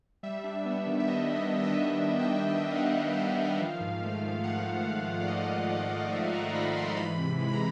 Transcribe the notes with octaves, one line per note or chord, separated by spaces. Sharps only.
G3 E5
D4
B3
D#3
E5
G3 D#5
D4
D#5
B3
D#5
E5
D#3
G3
D4
G5
B3
G5
D#3
F5
G3 F#5
D4
B3 F5
D#3
F3
G#2
A3
G#2
F3 F#5
G#2
A3
G#2
D5
F3 D#5
G#2
A3 D5
G#2 D5
D#5
F3 E5
G#2 A#5
A3 B5
G#2 C6
E3 B5
C3
B5
G#3
B5
A#5